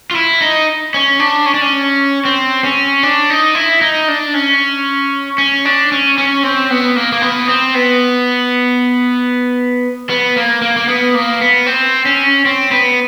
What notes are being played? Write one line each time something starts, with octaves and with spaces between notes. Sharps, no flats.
F4
E4
D#4
C#4
D4
C#4
D4
C#4
C4
C#4
D4
D#4
E4
D#4
D4
C#4
C#4
D4
C#4
C#4
C4
B3
A#3
A#3
B3
C4
B3
B3
A#3
A#3
A#3
B3
A#3
B3
C4
C#4
C4
B3